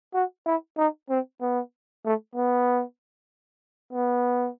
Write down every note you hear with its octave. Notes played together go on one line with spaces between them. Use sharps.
F#4
E4
D#4
C4
B3
A3
B3
B3